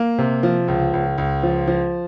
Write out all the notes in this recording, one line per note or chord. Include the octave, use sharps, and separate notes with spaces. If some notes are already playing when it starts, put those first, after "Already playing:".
Already playing: A#3
C3
F3
C#2
C#2
C#2
F3
F3